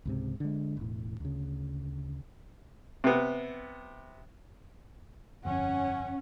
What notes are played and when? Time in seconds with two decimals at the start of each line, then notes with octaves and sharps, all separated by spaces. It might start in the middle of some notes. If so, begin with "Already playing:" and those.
0.05 C#2 G#2 C3
0.40 D3 G#3
0.77 E1 A2
1.20 D2 C#3
3.04 C3 B3
5.45 G1 F2 C#4 F#5